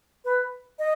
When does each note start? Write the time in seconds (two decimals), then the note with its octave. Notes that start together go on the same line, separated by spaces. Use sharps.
0.25 B4
0.79 D#5